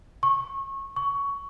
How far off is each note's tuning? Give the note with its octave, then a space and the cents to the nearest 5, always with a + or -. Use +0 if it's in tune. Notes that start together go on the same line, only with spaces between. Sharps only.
C#6 -25
C#6 +15